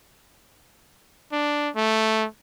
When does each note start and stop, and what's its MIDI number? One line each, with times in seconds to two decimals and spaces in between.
1.32 1.70 62
1.76 2.26 57